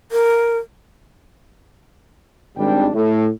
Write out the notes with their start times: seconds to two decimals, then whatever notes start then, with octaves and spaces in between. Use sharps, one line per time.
0.12 A#4
2.57 G#1 G3 D4 G5
2.94 A2